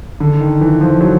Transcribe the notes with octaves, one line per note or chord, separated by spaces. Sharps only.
D3
D#3
E3
F3
F#3